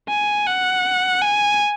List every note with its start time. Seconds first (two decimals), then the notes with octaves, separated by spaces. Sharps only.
0.09 G#5
0.46 F#5
1.21 G#5